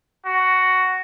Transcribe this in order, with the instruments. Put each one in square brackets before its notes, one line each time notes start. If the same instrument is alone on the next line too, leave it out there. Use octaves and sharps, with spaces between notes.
[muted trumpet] F#4